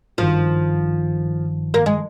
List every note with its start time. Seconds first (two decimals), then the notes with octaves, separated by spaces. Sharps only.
0.18 G#1 G2 D#3 F3
1.74 A#3
1.86 G#3